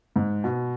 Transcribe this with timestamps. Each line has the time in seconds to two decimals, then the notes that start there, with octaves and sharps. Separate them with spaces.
0.16 G#2
0.44 B2